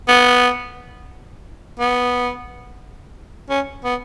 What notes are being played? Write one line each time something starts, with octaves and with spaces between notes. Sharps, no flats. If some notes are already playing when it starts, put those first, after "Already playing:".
B3
B3
C#4
B3